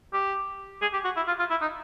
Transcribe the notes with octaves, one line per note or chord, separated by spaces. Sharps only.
G4
G#4
G4
F#4
E4
F4
F4
E4
D#4